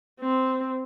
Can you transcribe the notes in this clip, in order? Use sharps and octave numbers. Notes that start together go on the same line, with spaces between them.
C4